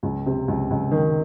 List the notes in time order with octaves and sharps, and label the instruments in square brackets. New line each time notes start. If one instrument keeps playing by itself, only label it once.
[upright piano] C#2
C3
C#2
C#2
D#3